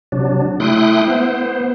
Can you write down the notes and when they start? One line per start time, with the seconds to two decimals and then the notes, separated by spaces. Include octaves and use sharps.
0.12 C3 F#3 D4
0.60 A3 E4 G5 C6 D#6 F#6
1.07 B3 C5